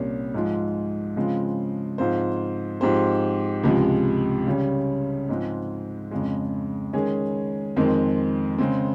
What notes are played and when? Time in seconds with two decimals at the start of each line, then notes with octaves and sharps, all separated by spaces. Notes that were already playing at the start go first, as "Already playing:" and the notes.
Already playing: C2 A#2 G3 C#4
0.34 G#2 F3 G#3
1.16 C#3 F3 G#3 C4 F4
1.98 G#2 F3 C4 F4 C5
2.81 G#2 F3 C4 G4 C5
3.64 C#2 C3 F3 G#3
4.47 C#3 G3 C#4
5.29 G#2 F3 G#3 C4
6.11 F2 C#3 G#3
6.93 D#3 G#3 C#4 G#4
7.76 F2 D#3 G#3 C4
8.58 C#3 G#3 C4